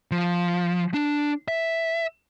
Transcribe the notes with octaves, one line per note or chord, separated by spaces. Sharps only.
F3
D4
E5